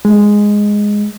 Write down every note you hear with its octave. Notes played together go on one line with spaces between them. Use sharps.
G#3